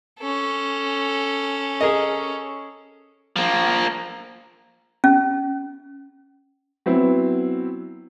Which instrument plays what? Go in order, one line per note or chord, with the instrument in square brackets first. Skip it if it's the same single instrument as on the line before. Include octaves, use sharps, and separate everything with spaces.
[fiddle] C#4 A4
[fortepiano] G#4 A#4 D#5
[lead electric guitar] F3 A#3
[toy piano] C#4
[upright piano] F#3 B3 C4 E4